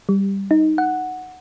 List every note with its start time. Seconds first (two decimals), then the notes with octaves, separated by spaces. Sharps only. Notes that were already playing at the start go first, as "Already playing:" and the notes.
0.09 G3
0.51 D#4
0.78 F#5